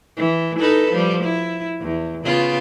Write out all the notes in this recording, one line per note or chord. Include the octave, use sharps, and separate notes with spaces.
E3
D#4 A4 B4
F3 G3
E4
E2
C#3 B3 F4